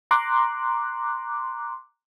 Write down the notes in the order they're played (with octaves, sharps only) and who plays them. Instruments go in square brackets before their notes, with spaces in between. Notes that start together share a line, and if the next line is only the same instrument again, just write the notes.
[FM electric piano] A#5 C6 D6 F#6